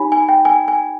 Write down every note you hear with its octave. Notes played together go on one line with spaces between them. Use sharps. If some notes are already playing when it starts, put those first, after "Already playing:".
Already playing: D#4 G4 C#5 G#5 B5
G#5
G5
G#5
G#5